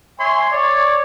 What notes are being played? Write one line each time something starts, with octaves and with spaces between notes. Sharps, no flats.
C#5 E5 G#5 C6
C#5 D5